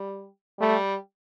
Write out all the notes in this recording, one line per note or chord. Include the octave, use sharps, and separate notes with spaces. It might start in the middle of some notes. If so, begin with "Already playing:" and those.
Already playing: G3
G3 A3